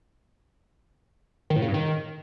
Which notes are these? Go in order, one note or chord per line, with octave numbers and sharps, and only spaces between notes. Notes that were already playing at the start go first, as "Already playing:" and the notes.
D#3
A2
C#3
G2
D#3